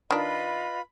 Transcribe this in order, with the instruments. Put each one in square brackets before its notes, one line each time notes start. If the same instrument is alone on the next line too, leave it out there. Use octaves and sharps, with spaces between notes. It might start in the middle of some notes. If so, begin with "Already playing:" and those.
[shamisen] D#3 D4 [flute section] F4 B4 D#5 [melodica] B5